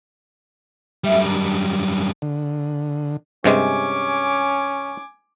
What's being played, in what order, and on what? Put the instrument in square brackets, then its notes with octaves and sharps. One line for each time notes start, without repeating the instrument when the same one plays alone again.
[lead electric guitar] F#2 G3 [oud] A3 E5 F5
[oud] D#3 D4 D#4
[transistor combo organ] D3
[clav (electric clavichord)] G2 C3 G#3 [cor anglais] C#4 [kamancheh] G#5 D6